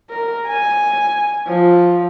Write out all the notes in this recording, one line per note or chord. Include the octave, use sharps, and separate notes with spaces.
A#4
G#5
F3